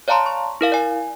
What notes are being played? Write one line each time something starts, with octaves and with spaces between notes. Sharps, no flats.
C#5 D5 F5 A5 A#5 C6
C#6
E4 A#4 F5
D5 G#5